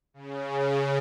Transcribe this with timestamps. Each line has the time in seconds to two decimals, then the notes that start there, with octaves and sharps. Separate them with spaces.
0.14 C#3